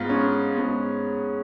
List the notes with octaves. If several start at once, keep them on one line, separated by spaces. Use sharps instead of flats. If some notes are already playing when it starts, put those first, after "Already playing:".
Already playing: G#2 G#3 B3 F4
C#4
G#2 G#3 B3